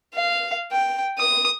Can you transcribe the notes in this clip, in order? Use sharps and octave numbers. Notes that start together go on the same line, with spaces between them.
F5
G5
D#6